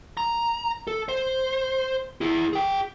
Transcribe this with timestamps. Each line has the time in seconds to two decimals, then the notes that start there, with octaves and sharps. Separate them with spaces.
0.17 A#5
0.88 A4
1.09 C5
2.21 E4 G#4
2.53 G#4 G5